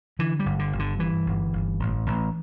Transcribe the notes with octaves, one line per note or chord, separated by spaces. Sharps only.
D3 E3
G3
G1
D3
G1
D3
G2 E3
G1
G1
A1
A1